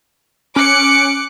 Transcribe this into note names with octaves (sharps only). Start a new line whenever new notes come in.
C#4 D6 F#6 C#7